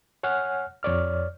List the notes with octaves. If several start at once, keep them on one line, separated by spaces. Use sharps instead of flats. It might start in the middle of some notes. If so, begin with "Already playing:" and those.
C#5 F#5 G#5 F6 F#6
F2 C#5 D5 F6